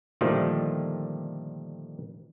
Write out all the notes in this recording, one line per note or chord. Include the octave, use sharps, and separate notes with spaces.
A#2 D3 D#3 F3 G3 A3